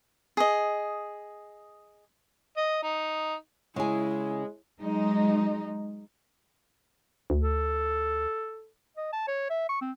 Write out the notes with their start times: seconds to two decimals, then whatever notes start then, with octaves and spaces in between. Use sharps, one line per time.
0.37 G#4 D#5
2.57 D#5
2.83 D#4
3.76 C#3 G#3 E4 G#4
4.81 F#3 G#3 D#4
7.30 D2
7.43 A4
8.97 D#5
9.13 A5
9.28 C#5
9.50 E5
9.69 C#6
9.81 C4